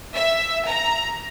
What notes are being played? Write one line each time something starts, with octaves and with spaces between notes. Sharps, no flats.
E5
A#5